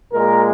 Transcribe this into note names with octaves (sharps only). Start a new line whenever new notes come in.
A#2 G#3 A#4